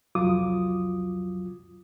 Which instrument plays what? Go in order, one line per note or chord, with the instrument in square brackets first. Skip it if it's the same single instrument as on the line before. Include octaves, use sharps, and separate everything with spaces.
[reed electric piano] C2 F2 F#3 F4 D6 D#6